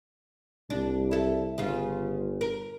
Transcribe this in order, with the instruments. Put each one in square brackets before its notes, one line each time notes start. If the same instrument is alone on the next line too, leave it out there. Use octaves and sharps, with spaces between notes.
[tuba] C2 [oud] D4
[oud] E4 A4
[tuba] G1 [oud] C#3 F4
[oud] A#4